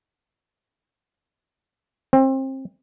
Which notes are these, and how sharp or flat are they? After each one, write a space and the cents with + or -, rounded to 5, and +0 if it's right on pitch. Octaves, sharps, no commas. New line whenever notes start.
C4 +30